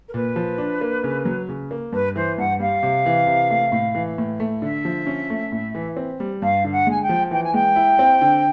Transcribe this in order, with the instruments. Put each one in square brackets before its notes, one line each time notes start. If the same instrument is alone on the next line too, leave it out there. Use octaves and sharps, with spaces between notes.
[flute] A#4
[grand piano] A#2 [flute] B4
[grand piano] F3
D4
A#3
C#3
F#3
C#3
A#3
[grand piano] G2 [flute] B4
[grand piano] E3 [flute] C5
[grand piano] G2 [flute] F#5
[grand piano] G3 [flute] F5
[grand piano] C3
E3
C3
A3
A2
E3
A2
A3
[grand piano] D3 [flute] E5
[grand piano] F3
C#4
A3
A2
E3
C4
G3
[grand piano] G2 [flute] F5
[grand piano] D3
[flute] F#5
[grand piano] G#3 [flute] G#5
[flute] G5
[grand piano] F3
[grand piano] E3 [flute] G5
[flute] G#5
[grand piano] G#3 [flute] G5
[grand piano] E4
C4
D3